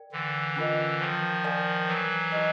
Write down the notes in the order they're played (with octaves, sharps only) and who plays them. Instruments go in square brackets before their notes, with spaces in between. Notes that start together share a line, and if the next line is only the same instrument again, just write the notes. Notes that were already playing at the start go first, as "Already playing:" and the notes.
Already playing: [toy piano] A#4 D5 G5
[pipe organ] D3 E3
[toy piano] C#4 F4 A#4 D#5
[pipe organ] D#3 F3
[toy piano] A#4 D5 F5 G#5
[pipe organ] E3 F#3
[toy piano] D#4 G4 B4 D#5